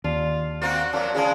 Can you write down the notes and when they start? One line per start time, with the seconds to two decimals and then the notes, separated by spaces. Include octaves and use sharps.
0.04 D#2 D4 F4
0.62 A#3 C4 F#4
0.93 A#2 F3 F#3 D4 C6
1.14 C#3 F3 G#3 G#4 A5